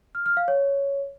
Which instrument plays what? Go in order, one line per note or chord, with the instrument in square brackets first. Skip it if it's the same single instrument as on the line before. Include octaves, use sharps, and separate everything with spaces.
[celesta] F6
F6
F5
C#5